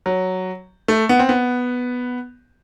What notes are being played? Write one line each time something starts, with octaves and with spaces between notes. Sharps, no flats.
F#3
A3
B3
C4
B3